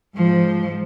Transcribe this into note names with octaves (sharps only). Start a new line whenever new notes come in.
G#2 F3